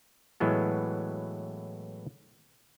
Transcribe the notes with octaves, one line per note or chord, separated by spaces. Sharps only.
A2 E3 F#3 G#3 B3